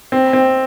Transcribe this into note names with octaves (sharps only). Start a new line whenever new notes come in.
C4
C4